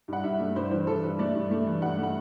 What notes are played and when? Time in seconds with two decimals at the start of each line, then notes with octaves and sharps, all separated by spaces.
0.08 G2 F#5
0.24 G2 E5
0.40 A3
0.56 G2 C5
0.71 E3 C5
0.87 E3 A4
1.03 G2 B4
1.19 A3 D5
1.35 G2
1.51 A3
1.67 E3
1.82 G2 F#5
1.98 A3
2.03 F#5